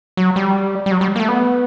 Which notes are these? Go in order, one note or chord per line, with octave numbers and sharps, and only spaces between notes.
F#3
G3
G3
F#3
G3
A#3
A3
B3